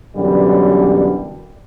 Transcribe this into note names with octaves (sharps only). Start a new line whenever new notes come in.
F#2 B2 D3 E3 F#3 G3